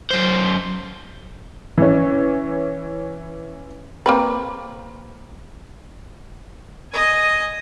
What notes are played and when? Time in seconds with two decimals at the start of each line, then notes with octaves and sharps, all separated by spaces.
0.11 F#2 C5
1.78 E3 C#4
4.06 A#3 C4 B4
6.92 D#5 G#5